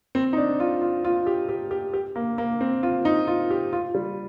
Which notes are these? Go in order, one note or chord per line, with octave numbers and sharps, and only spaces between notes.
C4
D#4
D4
F4
F4
F4
G4
G4
G4
G4
A#3
A#3
C4
F4
D#4
F4
G4
F4
G3